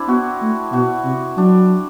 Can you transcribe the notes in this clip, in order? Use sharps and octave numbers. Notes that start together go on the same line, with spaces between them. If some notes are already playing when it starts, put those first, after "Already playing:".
Already playing: C4 D4 E4
B3 F#4
A3
B2 F#4
C3
F#3 D4